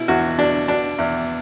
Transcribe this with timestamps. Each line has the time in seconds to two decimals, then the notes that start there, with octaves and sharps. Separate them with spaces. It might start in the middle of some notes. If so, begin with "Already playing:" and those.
Already playing: B2 E4
0.08 E2 F#4
0.38 B2 D4
0.68 B2 D4
0.99 E2